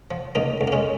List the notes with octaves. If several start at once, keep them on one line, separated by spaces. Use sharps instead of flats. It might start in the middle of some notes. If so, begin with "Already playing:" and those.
F3
C#2 A#3 D#4
C#2
A#3
G#3 C#4